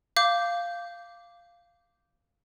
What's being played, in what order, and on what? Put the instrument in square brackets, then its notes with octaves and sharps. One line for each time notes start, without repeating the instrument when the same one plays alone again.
[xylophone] F5 D6 G6